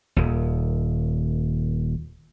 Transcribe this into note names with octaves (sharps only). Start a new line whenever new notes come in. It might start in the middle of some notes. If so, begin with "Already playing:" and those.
D#1 D#2